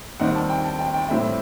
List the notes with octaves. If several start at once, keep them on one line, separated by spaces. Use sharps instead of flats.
D#2 D#3 G3 C4 F#5
A5
G5
A5
G5
G5
A2 E3 G3 C4 E5